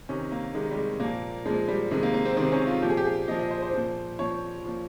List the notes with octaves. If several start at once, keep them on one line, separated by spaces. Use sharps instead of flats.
C3 D#3 C#4
A#3
C3 D#3 G#3
G3
G#3
A#2 F3 A#3
A#2 F3 G#3
G3
C3 D#3 G#3
A#3
A#3
C4
C3 D#3 C4
C#4
F4
A#2 F3 G4
G#4
G4
G#4
A#2 F3 D#5
D#5
C5
C5
A#2 F3
A#2 F3 C#5
A#2 F3